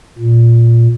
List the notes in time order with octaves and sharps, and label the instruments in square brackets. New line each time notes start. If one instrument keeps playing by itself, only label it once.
[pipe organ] A#2